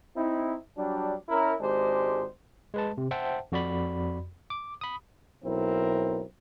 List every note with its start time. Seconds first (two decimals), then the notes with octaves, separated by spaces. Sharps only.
0.15 C4 D#4 E4
0.77 F#3 G3 D4
1.29 C#4 E4 A#4
1.60 G#1 G#3 D4 G4 C5
2.74 G#3 B4 A5
2.98 C3
3.11 C5 E5 F#5 G5 A5
3.52 F2 F#4 D5 B5
4.50 D6
4.81 B5 D#6
5.44 B1 C4 E4 A#4